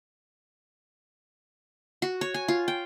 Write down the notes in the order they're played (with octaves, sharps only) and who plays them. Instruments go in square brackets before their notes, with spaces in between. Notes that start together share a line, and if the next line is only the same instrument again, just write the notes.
[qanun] F#4
C#5
G#5
F4
G5